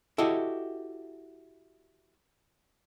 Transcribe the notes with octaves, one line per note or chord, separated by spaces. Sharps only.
E4 F#4 G4 A4 D#5